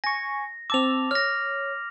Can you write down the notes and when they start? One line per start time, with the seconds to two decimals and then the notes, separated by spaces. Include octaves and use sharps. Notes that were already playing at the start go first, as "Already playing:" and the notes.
0.04 G#5 C#6 A#6
0.70 C4 A5 D6 E6 F7
1.11 C#5 F6 A#6